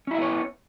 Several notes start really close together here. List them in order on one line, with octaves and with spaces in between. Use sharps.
C#4 E4 E5 B3 C#5